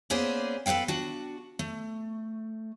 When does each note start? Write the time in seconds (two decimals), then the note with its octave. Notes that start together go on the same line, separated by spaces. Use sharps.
0.10 A#3 B3 C#4 G#4 C5 D5
0.66 A4 B4 C#5 F5 G5
0.88 D4 F#4
1.59 A3